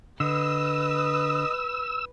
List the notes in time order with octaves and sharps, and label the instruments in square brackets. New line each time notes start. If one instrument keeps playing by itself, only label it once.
[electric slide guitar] D3 [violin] B4 [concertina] D#5 D#6 [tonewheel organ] E6